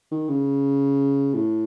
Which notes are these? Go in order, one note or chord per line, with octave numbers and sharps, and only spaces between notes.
D#3
C#3
A2